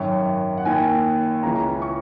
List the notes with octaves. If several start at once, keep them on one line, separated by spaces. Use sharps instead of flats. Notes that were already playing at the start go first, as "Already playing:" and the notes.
Already playing: G#1 F#2 D#3 C#5
F#5
D#2 D#3 G#5
C#2 C#3 E3 A#5
C#6